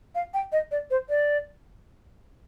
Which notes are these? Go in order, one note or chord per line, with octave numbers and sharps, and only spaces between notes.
F5
G5
D#5
D5
C5
D5